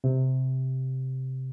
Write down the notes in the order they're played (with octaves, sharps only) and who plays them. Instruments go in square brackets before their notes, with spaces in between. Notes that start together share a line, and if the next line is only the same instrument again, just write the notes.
[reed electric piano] C3